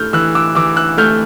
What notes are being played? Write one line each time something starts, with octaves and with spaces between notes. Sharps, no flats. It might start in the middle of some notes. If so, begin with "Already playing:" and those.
Already playing: A2 A3 F6 G6
E3 E6 F#6
D6 E6
E3 D6 E6
E6 F#6
A3 F6 G6